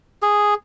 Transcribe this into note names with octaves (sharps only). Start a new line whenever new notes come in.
G#4